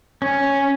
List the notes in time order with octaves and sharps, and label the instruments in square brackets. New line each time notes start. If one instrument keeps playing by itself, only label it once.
[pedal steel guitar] C#4